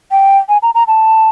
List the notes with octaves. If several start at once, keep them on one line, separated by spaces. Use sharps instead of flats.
G5
G#5
A#5
A#5
A5